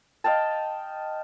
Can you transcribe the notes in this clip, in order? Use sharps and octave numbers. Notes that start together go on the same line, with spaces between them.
D#5 F5 G5 A5